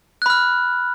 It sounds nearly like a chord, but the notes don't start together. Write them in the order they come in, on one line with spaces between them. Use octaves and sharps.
F#6 B5 F6